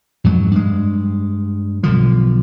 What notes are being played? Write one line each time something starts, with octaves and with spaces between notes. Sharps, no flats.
F2 G#2 F#3
G2 G#3
B1 D3 F3